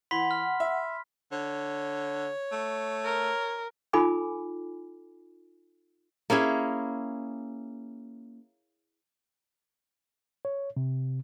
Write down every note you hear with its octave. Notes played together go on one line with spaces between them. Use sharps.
E3 F#5 B5 C6 B6
F6
E5
D3 C#5
A3
A#4
D#4 F4 A4 G#5 B5 D6
A#3 C#4 E4 G#4
C#5
C3